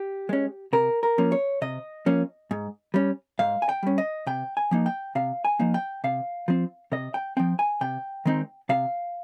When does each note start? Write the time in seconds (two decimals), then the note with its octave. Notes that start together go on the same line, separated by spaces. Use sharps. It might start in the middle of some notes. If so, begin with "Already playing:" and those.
Already playing: G4
0.29 G#3 C#4
0.73 C3 A#4
1.03 A#4
1.18 F3 A#3 C#4
1.32 C#5
1.62 C3 D#5
2.06 F3 A#3 C#4
2.51 G#2
2.94 G3 C#4
3.39 G#2 F5
3.62 G#5
3.69 G5
3.83 G3 C#4
3.98 D#5
4.27 C3 G5
4.57 G#5
4.71 F3 A#3 D#4
4.86 G5
5.15 C3 F5
5.45 G#5
5.59 F3 A#3 D#4
5.74 G5
6.04 C3 F5
6.48 F3 C4
6.92 C3 D#5
7.14 G5
7.37 F3 C4 G5
7.59 G#5
7.81 C3 G5
8.26 D#3 G#3 C4 D#4
8.69 C3 F5